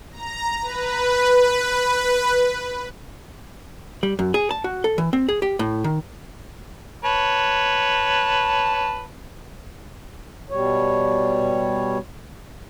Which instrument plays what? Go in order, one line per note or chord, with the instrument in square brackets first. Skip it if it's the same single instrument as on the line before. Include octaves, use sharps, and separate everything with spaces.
[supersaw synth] A#5
B4
[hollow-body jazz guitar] G3
F#2
G#4
A5
F#4
A4
E3
C4
G#4
G4
A2
D#3
[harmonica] B4 C#5 A5
[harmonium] B2 G3 C#5